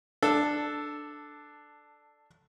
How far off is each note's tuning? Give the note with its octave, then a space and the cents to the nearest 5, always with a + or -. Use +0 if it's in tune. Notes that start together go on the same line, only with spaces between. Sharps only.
D4 +10 A4 +0